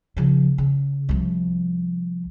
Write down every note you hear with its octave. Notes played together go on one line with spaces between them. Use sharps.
C#3 F3
C#3
C2 F3